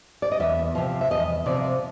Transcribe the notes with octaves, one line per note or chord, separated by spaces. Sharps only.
D5
D#5
E2 E5
C3 F3
E5
E2 D#5
C3 F3 D5